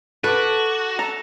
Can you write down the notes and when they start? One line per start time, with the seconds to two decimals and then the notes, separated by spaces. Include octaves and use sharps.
0.24 F#4 A4 B4 A5 D6
0.99 A4 A#5